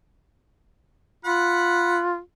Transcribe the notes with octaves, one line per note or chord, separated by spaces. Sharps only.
F4 F#5 B5